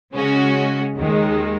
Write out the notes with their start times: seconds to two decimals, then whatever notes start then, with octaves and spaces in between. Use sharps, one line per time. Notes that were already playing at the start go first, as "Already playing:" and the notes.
0.13 C#3 G#3 C#4 F#4
0.97 D#2 D#3 G#3